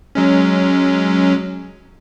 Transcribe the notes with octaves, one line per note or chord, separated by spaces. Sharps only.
F#3 G#3 C#4